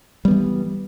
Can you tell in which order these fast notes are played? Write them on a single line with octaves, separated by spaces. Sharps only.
G3 B3 E3